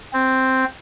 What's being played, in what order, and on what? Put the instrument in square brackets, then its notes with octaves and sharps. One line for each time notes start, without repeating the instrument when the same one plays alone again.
[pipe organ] C4